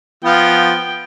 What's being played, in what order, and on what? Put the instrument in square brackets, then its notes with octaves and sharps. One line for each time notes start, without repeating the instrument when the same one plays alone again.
[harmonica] F3 B3 F4 [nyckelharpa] G5